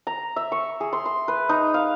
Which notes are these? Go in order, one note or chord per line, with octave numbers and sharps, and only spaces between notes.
A#5
E5
C#6
G#4
C6
C6
B4
D#4
F5